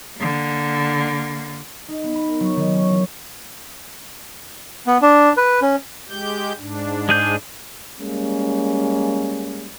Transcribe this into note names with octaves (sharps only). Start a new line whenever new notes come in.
D3 A#3
D#4
B3
B5
A#4
F#3
D#3
C#4
E3
B3
D4
B4
C#4
G#3 G4 G6
G#2 D4
G#3 G#4 G6
G3 G#3 A#3 C#4